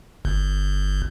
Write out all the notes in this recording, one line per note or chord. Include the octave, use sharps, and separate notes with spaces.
G1